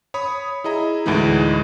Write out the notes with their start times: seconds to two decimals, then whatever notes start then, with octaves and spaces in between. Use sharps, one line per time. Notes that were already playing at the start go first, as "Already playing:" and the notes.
0.14 C#5 B5 D#6
0.64 E4 G#4 D#5 A#5
1.06 D2 A2 E3 G#3 D#4